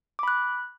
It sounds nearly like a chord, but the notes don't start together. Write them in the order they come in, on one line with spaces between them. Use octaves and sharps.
D6 B5 F#6